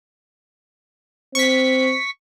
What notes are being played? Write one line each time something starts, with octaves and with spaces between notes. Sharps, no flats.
C4 C#6 B6